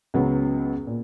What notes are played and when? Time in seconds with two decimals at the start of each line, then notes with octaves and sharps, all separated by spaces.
0.14 C#2 C#3 F#3 B3
0.87 A#2